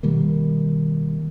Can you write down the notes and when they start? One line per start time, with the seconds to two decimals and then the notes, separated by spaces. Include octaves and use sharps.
0.03 B2 D#3 G3 A#3